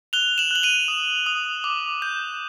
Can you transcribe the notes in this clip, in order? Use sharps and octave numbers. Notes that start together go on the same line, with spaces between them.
F#6 F7 G7
E7 F#7
F#6 F#7
D#7 F7
D#6
D#6
D6
G6